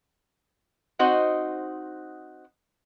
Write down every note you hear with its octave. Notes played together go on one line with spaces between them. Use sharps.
C4 D#4 F#4 C5 D#5 F#5